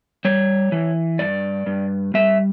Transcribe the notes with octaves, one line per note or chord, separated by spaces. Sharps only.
G3 C#5
E3
G2 D5
G2
G3 E5